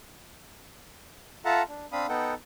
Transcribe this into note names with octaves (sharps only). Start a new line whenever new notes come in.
F4 A4 E5 F#5 A5 A#5
D4
C4 D4 F5 B5 D#6
B3 D#4 A4 F#5 G5